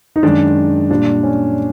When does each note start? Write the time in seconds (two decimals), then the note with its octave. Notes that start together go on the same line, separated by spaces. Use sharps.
0.16 D#4
0.23 F#2 D#3 G#3 D4
0.91 A#2 G3 D4
1.23 C#4